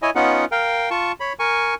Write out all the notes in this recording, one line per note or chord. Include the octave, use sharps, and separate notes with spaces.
E4 C#5 D#5 G#5
B3 C#4 D#4 F4 F#5
A#4 F5 G5
F4 A5 C#6
C#5 B5
A#4 G#5 C#6